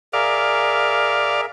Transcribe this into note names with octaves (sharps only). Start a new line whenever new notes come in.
G#4 A#4 D5 E5 F5